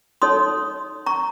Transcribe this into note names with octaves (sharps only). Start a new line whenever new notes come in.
D#4 A4 C#5 C6 D#6
A#5 C#6